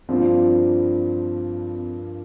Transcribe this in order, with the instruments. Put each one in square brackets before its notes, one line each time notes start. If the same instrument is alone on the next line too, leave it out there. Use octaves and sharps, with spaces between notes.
[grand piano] G2 F3 A#3 D4 F4 [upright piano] C4